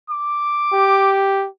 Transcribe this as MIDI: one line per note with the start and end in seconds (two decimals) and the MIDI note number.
0.10 1.23 86
0.73 1.47 67